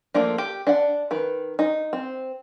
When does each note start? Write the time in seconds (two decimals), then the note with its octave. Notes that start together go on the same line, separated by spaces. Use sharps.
0.14 F3 A3 A#3 D4
0.38 G4
0.67 D4 F#5
1.11 D#3 B4
1.59 D#4
1.93 C4